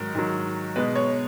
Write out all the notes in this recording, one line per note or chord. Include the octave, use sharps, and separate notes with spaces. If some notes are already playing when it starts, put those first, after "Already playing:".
Already playing: G#2 D#3 F#3 A#4
G#2 D#3 F#3
B2 G#3 B4
C#5